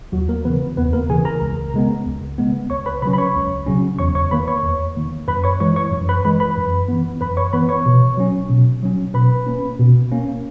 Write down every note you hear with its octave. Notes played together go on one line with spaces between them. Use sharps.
D#2 F#3 F#4
A#3 A#4
C#3 E3 B3 B4
D#2 B3 B4
A#3 A#4
C#3 E3 G#4 G#5
A#4 A#5
C#2
C#3 G#3 B3
C#2
C#3 G#3 B3
C#2 C#5 C#6
B4 B5
C#3 F#3 C#4 B4 B5
B5
C#5 C#6
C#2
C#3 F#3 C#4
E2 C#5 C#6
C#5 C#6
D#3 A#3 B4 B5
C#5 C#6
E2
D#3 A#3
F#2 B4 B5
C#5 C#6
E3 G#3 C#5 C#6
C#5 C#6
F#2
B4 B5
E3 G#3 B4 B5
B4 B5
F#2
E3 B3
F#2 B4 B5
C#5 C#6
E3 B3 B4 B5
C#5 C#6
B2
F#3 C#4
B2
F#3 C#4
B2 B4 B5
A#3 C#4
B2
A#3 C#4